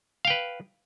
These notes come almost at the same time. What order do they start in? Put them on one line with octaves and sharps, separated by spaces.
F5 G5 B4